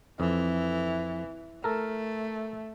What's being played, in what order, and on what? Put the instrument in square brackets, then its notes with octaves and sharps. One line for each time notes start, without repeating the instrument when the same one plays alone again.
[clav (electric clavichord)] F2 [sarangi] E3
[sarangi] A3 [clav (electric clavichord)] A4 A#4